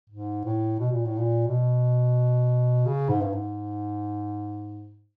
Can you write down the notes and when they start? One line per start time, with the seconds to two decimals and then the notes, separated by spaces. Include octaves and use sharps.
0.10 G#2
0.45 A2
0.79 B2
0.92 A#2
1.05 A2
1.18 A#2
1.48 B2
2.86 C#3
3.09 G#2
3.22 G2
3.33 G#2